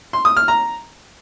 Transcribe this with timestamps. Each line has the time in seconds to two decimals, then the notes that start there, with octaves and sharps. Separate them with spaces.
0.13 C6
0.25 D#6
0.37 F6
0.48 A#5